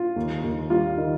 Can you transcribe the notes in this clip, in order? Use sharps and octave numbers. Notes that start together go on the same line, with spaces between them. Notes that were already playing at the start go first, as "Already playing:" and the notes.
Already playing: F4
D#2
D#2
G3 F4
D#3